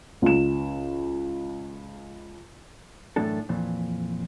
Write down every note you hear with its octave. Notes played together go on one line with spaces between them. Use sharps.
C#2 E7
F#2 A2 E3 D4 A4
F2 A#2 E3